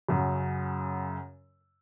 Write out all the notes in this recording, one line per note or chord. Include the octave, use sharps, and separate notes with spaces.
F#2 C#3 F#3